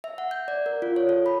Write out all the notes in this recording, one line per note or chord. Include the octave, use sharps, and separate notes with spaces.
E5
F#5
G6
D5
A#4
F4
C#5
A4
B5